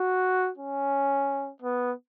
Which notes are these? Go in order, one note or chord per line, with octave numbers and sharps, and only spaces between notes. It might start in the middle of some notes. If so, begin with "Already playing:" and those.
Already playing: F#4
C#4
B3